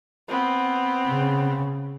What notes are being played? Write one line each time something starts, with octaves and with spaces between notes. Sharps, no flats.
B3 C4
C#3